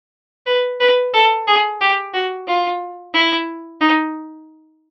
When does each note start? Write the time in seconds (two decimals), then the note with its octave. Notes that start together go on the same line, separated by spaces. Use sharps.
0.47 B4
0.80 B4
1.13 A4
1.47 G#4
1.80 G4
2.13 F#4
2.47 F4
3.14 E4
3.80 D#4